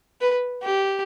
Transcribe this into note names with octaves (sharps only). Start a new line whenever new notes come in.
B4
G4